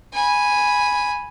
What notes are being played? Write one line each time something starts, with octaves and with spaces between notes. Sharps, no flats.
G#5 B5